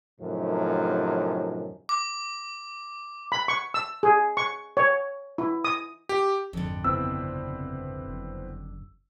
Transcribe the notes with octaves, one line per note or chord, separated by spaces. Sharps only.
F#2 A2 C3 D#3 F3
D6
B5
C#6
E6
G#4
C#6
C#5
E4
D#6
G4
G#1 F2 D3
G1 C2 C#3 B3 C4 E4 E6
F#1